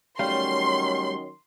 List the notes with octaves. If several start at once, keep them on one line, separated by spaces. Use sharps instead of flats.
D#3 F#3 G3 A3 C#4 F5 C6